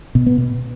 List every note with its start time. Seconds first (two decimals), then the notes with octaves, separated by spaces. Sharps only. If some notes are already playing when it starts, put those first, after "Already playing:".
0.15 B2
0.26 B3
0.38 B2